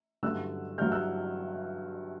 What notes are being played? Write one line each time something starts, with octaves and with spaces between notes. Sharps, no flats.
G2 D3 F#3 E6 F#6
G2 D3 F#3 F6 G6
E6 F#6